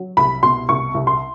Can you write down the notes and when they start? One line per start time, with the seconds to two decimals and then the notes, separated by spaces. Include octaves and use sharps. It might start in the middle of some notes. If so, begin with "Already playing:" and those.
Already playing: F#3
0.17 C2 B5
0.43 B2 C6
0.69 C2 C#6
0.94 C2
1.07 C6